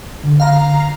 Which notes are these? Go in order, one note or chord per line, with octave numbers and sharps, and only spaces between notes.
D3
F5 A#5